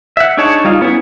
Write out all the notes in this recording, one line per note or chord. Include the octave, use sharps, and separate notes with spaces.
E5 F#5
D4 D#4 G#4 C#5 A5
G3 D#4 F4
B3 C#4 E4 G#4 B4